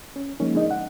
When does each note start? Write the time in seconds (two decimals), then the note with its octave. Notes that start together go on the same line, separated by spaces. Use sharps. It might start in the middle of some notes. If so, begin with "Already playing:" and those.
0.16 C#4
0.40 F3 G#3 A#3 C#4 D#4
0.55 G#3 D4 D#4 D#5
0.71 F#5